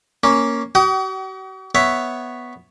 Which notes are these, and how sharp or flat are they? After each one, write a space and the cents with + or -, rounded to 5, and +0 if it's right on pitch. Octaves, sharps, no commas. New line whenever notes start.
A#3 +0 C#4 +0
F#4 +45 G5 -45 D#6 +10
B3 +0 C#5 +0 E5 +0